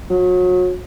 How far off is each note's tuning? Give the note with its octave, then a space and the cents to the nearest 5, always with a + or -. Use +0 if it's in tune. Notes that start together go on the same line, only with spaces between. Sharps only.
F#3 -30